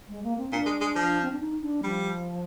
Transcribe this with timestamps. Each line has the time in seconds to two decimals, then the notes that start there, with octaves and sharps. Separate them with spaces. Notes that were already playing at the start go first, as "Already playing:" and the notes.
0.09 G#3
0.23 A#3
0.37 C4
0.51 A#2 D4
0.66 G#3
0.81 G#3
0.96 F3
1.22 C4
1.31 D4
1.40 D#4
1.61 D4
1.83 F3 G3